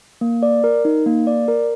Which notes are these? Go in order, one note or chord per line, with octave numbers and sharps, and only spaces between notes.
A#3
D5
A#4
D#4
A#3
D5
A#4